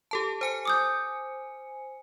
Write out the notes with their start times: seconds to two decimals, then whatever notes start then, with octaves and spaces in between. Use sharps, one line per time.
0.11 G4 A4 A5
0.41 C5 G#5 C#7
0.65 D6 D#6 G6